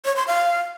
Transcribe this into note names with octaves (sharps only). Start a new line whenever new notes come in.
C#5
C6
F5